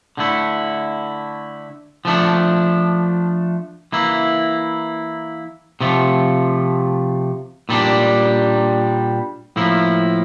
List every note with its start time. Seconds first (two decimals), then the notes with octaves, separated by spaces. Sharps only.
0.17 D3 A3 E4
2.05 F3 A3 D4
3.92 E3 A#3 E4
5.80 C3 F3 A3
7.69 A#2 G3 D4
9.56 A2 F3 A#3 E4